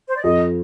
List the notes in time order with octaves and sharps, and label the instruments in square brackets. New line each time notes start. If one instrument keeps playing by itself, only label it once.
[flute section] C5
D5
[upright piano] F2 [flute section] D#5